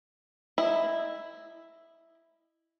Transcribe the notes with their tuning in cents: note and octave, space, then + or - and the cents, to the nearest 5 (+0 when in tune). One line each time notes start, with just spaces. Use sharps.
E4 +0 D#5 -15